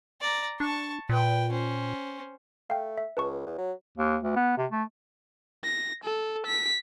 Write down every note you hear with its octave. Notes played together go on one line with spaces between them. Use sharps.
D5 A#5
D4 A5 C#6
A#2 B4 G5
C#4 C5
A3 F5 G5
E5
C#2 B4 A5 C#6
E2
F#3
D#2
D2
B3
C3
A3
A#6
A4
B6